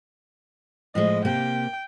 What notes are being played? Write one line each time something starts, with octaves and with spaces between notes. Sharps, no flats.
A2 F3 G#3 D#5
C3 A#3 G4 G5